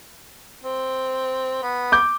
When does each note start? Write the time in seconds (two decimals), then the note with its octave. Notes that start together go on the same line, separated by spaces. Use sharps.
0.64 C4
1.63 B3
1.92 D6 G6